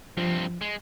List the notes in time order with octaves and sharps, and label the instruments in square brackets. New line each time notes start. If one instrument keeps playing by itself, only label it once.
[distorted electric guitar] G2 C4 [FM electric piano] F3
[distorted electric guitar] G#3